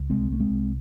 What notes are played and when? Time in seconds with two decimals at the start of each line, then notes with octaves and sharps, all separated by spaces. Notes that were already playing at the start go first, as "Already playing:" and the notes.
Already playing: C#2
0.10 C2 G#3 C4
0.30 C2 A3
0.40 G#3 C4
0.50 C2